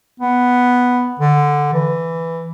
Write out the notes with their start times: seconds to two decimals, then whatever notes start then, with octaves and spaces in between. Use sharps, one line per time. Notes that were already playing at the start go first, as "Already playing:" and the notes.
0.20 B3
1.19 D3
1.74 E3